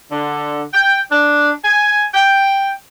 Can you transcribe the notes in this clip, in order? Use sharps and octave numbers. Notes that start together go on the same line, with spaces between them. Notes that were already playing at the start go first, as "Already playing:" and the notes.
D3
G5
D4
G#5
G5